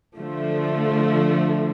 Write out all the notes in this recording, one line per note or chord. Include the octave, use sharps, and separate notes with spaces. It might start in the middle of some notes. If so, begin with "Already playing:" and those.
D3 F3 A3